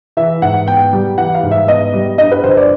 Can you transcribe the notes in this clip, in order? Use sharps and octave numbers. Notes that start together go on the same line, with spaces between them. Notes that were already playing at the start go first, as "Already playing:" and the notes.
E3 E5
G#2 F#5
B3 G5
G3
E3 F#5
F5
G#2
E5
B3 D#5
G3
G2 D#5
B4
G1 C5
D5